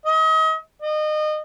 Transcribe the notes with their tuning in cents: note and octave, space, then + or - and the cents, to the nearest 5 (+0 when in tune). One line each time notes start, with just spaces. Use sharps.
D#5 +35
D#5 -30